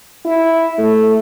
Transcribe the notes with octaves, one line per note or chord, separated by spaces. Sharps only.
E4
A3